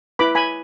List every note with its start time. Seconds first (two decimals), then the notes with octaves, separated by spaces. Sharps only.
0.19 E4 B4 B5 D6
0.35 G#5 B5